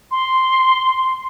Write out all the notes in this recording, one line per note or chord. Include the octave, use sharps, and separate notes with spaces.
C6